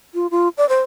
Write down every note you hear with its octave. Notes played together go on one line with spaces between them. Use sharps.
F4
F4
D5
C5